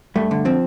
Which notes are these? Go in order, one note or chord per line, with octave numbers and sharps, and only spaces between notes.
G2 A3
D3
F3 C4